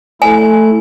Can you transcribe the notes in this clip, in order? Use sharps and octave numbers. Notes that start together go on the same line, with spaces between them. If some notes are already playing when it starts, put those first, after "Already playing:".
A3 E4 A4 G#5